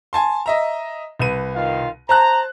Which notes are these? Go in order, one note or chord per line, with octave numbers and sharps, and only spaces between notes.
G#5 A5 C6
D#5 E5 A#5
C2 B4 D#7
D#3 F4 F5
C5 A5 A#5 F#6